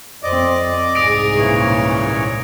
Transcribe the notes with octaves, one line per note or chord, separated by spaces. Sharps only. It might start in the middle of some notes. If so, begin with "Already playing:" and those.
F2 C4 D5 D#5 D6
C2 G#2 G#4 D#6 A#6 D7
A#2 C#3 E3 C#5